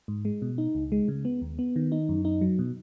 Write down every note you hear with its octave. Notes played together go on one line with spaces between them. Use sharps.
G#2
G#3
B2
D#4
C#2
G#3
C#3
B3
D#2
B3
D#3
D#4
F#2
D#4
F#3
B2